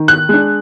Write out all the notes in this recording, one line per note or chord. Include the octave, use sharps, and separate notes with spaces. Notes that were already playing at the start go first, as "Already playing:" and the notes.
Already playing: D#3
F#6
G#3 D4